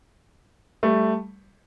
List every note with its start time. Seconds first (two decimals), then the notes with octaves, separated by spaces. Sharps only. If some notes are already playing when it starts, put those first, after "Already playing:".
0.83 G3 A3